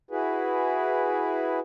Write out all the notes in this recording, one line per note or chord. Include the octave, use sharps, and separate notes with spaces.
E4 F#4 G#4 B4